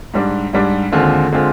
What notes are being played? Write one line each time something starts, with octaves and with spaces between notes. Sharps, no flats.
G#2 G3 D4
G#2 G3 D4
D#2 D3 G#3 C4 F4
D3 G#3 C4 F4